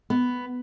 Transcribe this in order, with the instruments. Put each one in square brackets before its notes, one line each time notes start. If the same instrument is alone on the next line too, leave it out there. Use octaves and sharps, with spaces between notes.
[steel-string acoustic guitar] B3